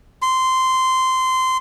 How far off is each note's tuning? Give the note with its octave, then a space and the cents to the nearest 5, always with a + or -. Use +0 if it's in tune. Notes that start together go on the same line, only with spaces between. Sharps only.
C6 -15